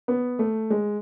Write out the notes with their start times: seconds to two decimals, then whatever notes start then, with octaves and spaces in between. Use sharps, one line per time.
0.08 B3
0.39 A3
0.70 G#3